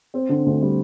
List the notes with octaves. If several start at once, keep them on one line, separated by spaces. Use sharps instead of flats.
C4
D3
D2
G3